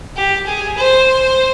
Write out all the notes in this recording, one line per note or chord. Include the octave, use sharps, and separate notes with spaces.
G4
G#4
C5